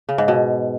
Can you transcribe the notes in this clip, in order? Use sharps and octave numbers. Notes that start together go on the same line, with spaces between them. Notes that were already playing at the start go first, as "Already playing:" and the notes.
C#3
G#2
B2